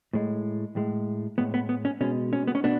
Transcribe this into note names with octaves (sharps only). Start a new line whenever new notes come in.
A2 G#3
A2 G#3
A2 G#3 B3
B3
B3
C#4
B2 G#3 C#4
C#4
B3
C#4
B2 B3 D4